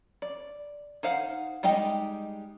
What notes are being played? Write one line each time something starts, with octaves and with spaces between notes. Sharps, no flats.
D5
D#4 C5 F5 F#5
G3 G#3 D#4 G4 D#5